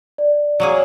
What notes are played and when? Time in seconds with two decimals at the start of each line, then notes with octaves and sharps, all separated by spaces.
0.18 D5
0.60 F#3 A#3 G#4